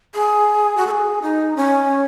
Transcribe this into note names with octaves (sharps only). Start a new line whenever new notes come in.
G#4
F#4
A4
G#4
D#4
C#4